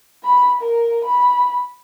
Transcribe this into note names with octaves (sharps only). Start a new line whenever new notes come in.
B5
A#4
B5